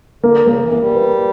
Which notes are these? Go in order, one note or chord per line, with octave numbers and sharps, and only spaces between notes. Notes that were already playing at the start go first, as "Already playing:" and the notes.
D3 A#3
C#3
A#3
E3
A#3
G3
B4